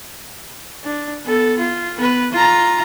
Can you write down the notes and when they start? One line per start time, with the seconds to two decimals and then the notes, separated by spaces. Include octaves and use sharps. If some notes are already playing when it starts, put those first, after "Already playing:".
0.84 D4
1.25 B3 A4
1.59 F4
1.97 B3 B4
2.32 F4 A#5